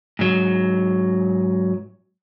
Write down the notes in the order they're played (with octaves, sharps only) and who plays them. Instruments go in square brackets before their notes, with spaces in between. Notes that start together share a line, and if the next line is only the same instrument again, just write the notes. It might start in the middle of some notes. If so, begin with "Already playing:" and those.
[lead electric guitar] G#2 F#3